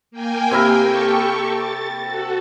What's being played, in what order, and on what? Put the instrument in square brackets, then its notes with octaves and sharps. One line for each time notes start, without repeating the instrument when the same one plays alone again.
[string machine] A#3 G5 G#5
[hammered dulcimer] C3 E4 A#4
[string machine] G4 A4 C#6
A6
F#4 A4